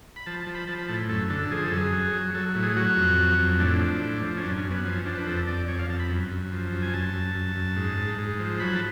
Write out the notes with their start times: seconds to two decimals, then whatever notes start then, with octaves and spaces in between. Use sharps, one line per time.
0.16 B5
0.26 F3 A5
0.40 A5
0.47 F3
0.54 B5
0.67 F3 A5
0.79 B5
0.89 A2 A5
1.09 F#2 A4
1.30 D3 A4
1.51 F3 G#4
1.65 A4
1.72 F#2
1.77 G#4
1.92 F#3
2.14 F#3
2.34 F#3 A4
2.55 A2
2.63 G#4
2.76 F#3 F#4
2.97 F2
3.18 F#3
3.38 F2
3.60 A2 D4
3.81 F3
4.01 A2
4.22 F3
4.37 C#4
4.43 F#2 D4
4.58 C#4
4.64 F#2
4.71 B3
4.85 F3 C#4
5.05 F3 D4
5.17 B4
5.26 F2 A4
5.47 F2 D5
5.68 F2 C#5
5.79 F5
5.89 F2 A5
6.00 B5
6.09 F#2
6.31 F#2
6.52 F3
6.72 F#2
6.82 G#5
6.94 F#2 A5
7.14 F#2
7.35 F#2
7.56 F#2
7.76 G#2
7.97 G#2
8.18 G#2
8.40 F3
8.60 F#3 B5
8.75 A5